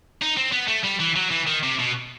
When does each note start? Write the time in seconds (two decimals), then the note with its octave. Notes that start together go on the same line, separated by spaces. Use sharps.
0.22 D#4
0.37 C4
0.53 B3
0.68 A3
0.85 G3
1.00 E3
1.16 F#3
1.31 E3
1.47 D#3
1.63 C3
1.79 B2